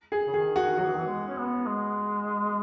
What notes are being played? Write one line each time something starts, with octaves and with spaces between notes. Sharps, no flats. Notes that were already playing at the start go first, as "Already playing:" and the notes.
G#4
C#3
D#3 G#4
F#4
F#3 F#4
E3
D#3
E3
G#3
C#4
B3
G#3